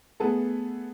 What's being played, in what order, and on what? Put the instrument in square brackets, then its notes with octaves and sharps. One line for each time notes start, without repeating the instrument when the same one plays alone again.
[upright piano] A3 B3 G#4 A4